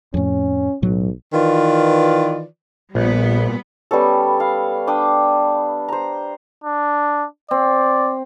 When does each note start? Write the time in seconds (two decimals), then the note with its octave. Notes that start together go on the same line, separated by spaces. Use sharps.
0.14 F2 A2 C#4
0.83 B1 A2 F#3
1.34 D#3 E3 F4 B4 D5
2.95 A#1 A#2 G3 B3
3.91 G3 B3 C#4 A4
4.40 F5
4.87 D4 G5 D6 D#6
5.88 C5 A#5
6.64 D4
7.51 C4 D5